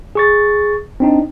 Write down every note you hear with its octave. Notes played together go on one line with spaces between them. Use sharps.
G#4 C#6 A6
C4 D4 D#4